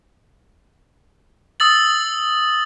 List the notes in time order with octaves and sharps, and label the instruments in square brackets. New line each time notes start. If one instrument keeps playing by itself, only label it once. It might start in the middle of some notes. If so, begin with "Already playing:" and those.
[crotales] D#6 E6 A6 F#7